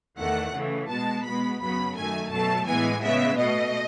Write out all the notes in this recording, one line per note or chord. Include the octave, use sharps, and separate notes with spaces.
E2 D#3 A3 F#5
C#3 E3 A3
B2 G#3 B3 A5
B2 G#3 B3 B5
F#2 C#3 F#3 B3 B5
F#2 D#3 A3 G#5
B2 F#3 A3 A5
A2 E3 G#3 B3 G#5
C#3 G#3 B3 E5
B2 A3 D#5